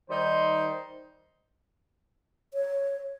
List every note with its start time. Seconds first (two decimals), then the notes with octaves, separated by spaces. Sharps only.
0.10 D#3 G3 D#4 C5 C6
2.54 C#5